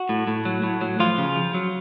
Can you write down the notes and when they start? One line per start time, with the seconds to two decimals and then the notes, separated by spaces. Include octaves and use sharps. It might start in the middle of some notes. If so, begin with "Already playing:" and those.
Already playing: F#4
0.09 A2
0.27 A2
0.45 F#3
0.63 A2
0.81 F#3
1.00 F3 F4
1.18 C#3
1.36 F3
1.54 F#3